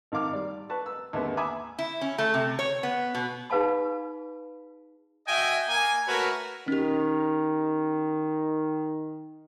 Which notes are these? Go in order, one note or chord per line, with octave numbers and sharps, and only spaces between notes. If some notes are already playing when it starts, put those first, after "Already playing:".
G#1 D#3 F5 D6 F6
G3 D5
B4 A5 C#6
E6
G#1 D#2 D3 G#3 B3 E5
E5 G#5 B5 D6 D#6
E4
C#4
A3
C3
C#5
B3
B2
D#4 G#4 B4 F5 A5 B5
F#4 D#5 E5 G5 G#5
A#3 G#5
A3 F#4 A#4 B4 C#5
D#3 C#4 G4